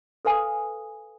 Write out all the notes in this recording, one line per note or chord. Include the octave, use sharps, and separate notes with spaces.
A4 B4 F5 G#5 D#6